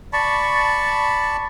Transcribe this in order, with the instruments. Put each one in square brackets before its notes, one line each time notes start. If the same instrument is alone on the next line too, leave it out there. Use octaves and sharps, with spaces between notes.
[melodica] D5 A5 B5 C#6